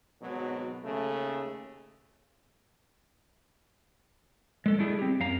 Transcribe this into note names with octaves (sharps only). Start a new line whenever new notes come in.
G#1 B2 F#3
D#2 C#3 A3
G#3 A4
G3 A3 D4 E4 G#4
C4 G4
F#2 F5 A#5